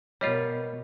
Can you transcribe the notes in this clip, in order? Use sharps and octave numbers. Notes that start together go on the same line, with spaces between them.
B2 G3 D#4 F4 A#4 B4 C#5 D#5